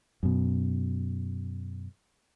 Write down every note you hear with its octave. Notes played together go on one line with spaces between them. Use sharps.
F#2 B2